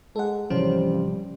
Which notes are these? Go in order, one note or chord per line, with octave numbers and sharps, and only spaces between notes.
G#3 A4 F#5
G#1 C3 E3 F3 G3 C#4 C5